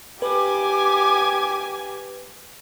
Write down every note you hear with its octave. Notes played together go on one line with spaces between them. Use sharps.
G4 B4 G#5 D6